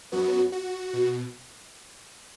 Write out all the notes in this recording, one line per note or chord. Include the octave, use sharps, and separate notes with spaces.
F#2 F#3 B3 F#4
F#4
B2